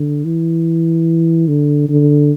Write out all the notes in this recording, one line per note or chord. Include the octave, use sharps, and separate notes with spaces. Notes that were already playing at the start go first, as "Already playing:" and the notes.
Already playing: D3
E3
D3
D3